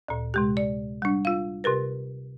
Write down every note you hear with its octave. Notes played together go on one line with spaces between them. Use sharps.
D2 A#2
C3 G#3 G4
D5
G3 D4
F4 F5
C3 G4 A#4 B4